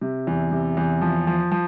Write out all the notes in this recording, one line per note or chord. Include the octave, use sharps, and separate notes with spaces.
C3
E2
C3
E2
F3
F3
F3